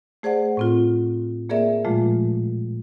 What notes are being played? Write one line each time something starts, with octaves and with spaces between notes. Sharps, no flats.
A3 G#4 C5 D5 F#5
A2 C4 F4
A#3 G#4 A#4 D5 E5
A#2 F3 G#3 A3 F4